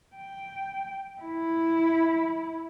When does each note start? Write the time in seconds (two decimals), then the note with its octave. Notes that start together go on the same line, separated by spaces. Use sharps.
0.15 G5
1.22 E4